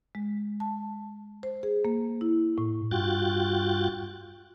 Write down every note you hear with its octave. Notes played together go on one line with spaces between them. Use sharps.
G#3
A5
C5
G#4
A#3
E4
A2
G2 F4 F#4 G5 F#6 A6